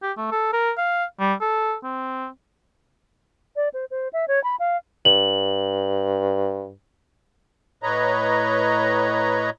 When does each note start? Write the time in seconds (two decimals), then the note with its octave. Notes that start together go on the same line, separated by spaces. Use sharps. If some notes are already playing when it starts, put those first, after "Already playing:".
0.02 G4
0.17 A3
0.31 A4
0.53 A#4
0.77 F5
1.20 G3
1.41 A4
1.83 C4
3.56 D5
3.74 C5
3.91 C5
4.13 E5
4.28 C#5
4.44 B5
4.60 F5
5.05 G2 F#7
7.83 A2 B4 C#5 D#5 A#5